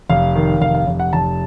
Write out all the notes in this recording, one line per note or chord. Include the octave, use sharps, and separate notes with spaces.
F1 F5
D#3
F1 F5
F5
F1
F#5
F1 A5